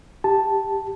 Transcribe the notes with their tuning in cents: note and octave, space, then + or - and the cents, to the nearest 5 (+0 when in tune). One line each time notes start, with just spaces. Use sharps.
G4 +5 A5 +0